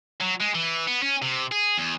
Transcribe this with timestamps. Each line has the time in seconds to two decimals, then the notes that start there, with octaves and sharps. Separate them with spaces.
0.21 F#3
0.41 G#3
0.55 E3
0.87 B3
1.02 C#4
1.22 C3
1.52 G#4
1.78 E2